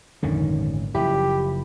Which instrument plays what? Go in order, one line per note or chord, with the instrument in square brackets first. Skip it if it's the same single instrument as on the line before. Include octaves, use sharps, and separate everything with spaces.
[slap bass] G#1 A#2 C#4 [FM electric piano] F2 D3 D#3
[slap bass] F#1 F3 [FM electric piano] E4 B5 [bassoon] G4